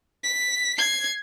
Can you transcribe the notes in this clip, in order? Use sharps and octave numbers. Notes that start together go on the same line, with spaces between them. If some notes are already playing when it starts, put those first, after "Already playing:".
B6
G#6 C7